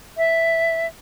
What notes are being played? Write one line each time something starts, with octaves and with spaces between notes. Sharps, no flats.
E5